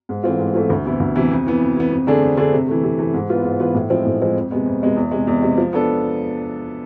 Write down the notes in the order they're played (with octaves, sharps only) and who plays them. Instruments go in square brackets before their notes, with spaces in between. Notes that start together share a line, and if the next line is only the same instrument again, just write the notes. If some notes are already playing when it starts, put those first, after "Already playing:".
[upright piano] G#2
E3 A3 C4 F4
G#2
E3 A3 C4 F4
D2
C3 E3 B3 E4
D2
C3 E3 B3 E4
F2
E3 B3
F2
E3 B3
F2
D3 A3 D4 G#4
F2
D3 A3 D4 G#4
C3
E3 A3
C3
E3 A3
G#2
E3 B3 F4 B4
G#2
E3 B3 F4 B4
A2
F3 G#3 C4 E4
A2
F3 G#3 C4 E4
F2
C3 G#3 B3
F2
C3 G#3 B3
E2
C3 G#3
E2
C3 G#3
F3
B3 D4 A4